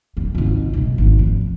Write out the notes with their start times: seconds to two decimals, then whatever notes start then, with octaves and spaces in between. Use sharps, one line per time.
0.17 E2 B2
0.35 G#1 C#2
0.73 B1 G#3
0.98 G#1 G#2
1.19 F2